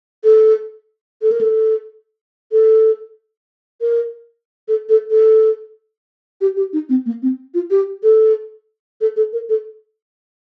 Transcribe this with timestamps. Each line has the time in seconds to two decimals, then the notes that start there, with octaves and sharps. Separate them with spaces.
0.24 A4
1.22 A4
1.32 A#4
1.41 A4
2.52 A4
3.81 A#4
4.68 A4
4.89 A4
5.10 A4
6.41 G4
6.57 G4
6.73 D#4
6.89 C4
7.06 A#3
7.22 C4
7.54 F4
7.71 G4
8.03 A4
9.01 A4
9.16 A4
9.33 A#4
9.49 A4